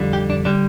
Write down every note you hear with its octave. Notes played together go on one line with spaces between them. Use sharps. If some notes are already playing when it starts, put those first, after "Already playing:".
Already playing: F2 D3 G3
G4
D4
D3 G3 D4